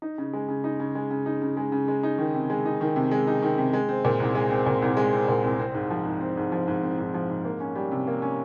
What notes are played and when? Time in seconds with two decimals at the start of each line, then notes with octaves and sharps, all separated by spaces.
0.02 D#4
0.18 C#3
0.33 G#3
0.48 C#3
0.64 D#4
0.80 C#3
0.95 G#3
1.11 C#3
1.26 D#4
1.42 C#3
1.57 G#3
1.72 C#3
1.88 G#3
2.03 D#4
2.18 D#3
2.34 C3
2.50 G#3
2.66 D#4
2.81 D#3
2.96 C3
3.11 G#3
3.27 D#4
3.42 D#3
3.58 C3
3.73 G#3
3.89 C4
4.05 A#2
4.20 C2
4.35 G#3
4.51 C4
4.66 A#2
4.82 C2
4.97 G#3
5.13 C4
5.28 A#2
5.44 C2
5.59 C4
5.74 G#2
5.90 F3
6.06 G#2
6.21 C4
6.37 G#2
6.52 F3
6.68 G#2
6.83 C4
6.99 G#2
7.14 F3
7.30 G#2
7.45 A#3
7.60 C#4
7.75 G3
7.91 C3
8.07 A#3
8.22 C#4